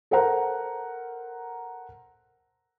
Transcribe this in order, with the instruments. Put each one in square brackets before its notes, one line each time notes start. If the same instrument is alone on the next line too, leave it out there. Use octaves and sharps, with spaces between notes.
[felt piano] A4 A#4 C5 F#5 A#5